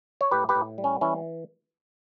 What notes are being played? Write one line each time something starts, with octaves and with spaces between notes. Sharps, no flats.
C#5
A2 G4 B4
G4 B4
A2
G3
C#4
E3 C#4 E4